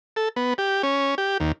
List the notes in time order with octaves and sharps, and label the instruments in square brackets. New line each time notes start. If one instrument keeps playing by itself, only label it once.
[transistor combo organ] A4
B3
G4
C#4
G4
D#2